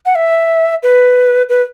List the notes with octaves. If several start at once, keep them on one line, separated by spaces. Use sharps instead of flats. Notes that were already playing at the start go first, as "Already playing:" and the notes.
F#5
E5
B4
B4